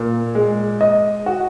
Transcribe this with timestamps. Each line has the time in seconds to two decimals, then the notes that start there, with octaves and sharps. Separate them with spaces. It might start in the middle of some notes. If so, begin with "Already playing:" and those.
Already playing: A#2
0.35 G#3
0.81 D#5
1.26 F#4